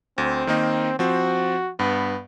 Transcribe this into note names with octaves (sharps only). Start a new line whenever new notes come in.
D2 C4
D#3 A#3 D#4
F3 C4 F#4
G2 B3